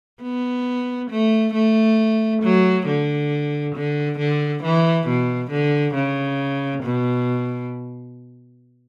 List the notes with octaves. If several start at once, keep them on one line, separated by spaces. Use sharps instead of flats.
B3
A3
A3
F#3
D3
D3
D3
E3
B2
D3
C#3
B2